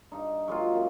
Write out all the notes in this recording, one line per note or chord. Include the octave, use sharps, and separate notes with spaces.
G2 D#4
F#3 G#3 A#3 F4
F#2